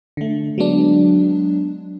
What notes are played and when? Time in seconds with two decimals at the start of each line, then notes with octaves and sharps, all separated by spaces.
0.17 D3 A3
0.58 F#3 G#3 B3 D4